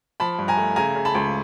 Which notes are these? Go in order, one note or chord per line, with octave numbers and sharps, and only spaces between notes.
F3 A5 B5
G2
G#5 A#5
A3
C#3 G#5 A#5
C#3
A5 B5
C#2